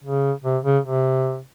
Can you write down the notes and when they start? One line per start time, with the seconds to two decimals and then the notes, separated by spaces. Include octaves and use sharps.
0.04 C#3
0.44 C3
0.64 C#3
0.84 C3